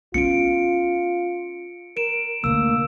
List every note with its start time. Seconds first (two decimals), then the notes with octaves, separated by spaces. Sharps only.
0.14 B3 C#4 F4 C#7 D7
1.97 A#4 D7 E7
2.44 D2 C3 A#3 E6